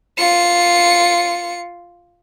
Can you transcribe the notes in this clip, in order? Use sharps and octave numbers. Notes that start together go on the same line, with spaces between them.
F4 C#7